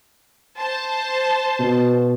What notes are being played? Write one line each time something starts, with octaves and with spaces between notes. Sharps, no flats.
C5 A5
B2